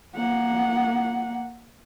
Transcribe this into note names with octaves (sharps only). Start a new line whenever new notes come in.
A#3 F#5